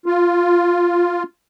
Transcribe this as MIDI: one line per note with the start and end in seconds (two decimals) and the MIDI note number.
0.06 1.23 65